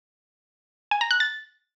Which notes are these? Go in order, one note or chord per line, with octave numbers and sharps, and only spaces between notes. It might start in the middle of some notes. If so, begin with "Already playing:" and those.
G#5
A#5
F#6
A6